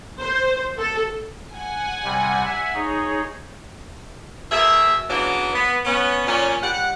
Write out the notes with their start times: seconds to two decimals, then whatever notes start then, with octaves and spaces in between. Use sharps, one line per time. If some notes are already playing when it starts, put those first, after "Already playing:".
0.20 C5
0.78 A4
1.53 F#5 G#5
2.04 C3 G3
2.44 E5
2.74 D#4 G#4 C#5
4.51 B2 G#4 A#4 E5
5.09 C#3 E3 F#3 A#3 B3 D4
5.54 B3
5.85 B3 C#4
6.27 A#2 C#4
6.62 G3 F#5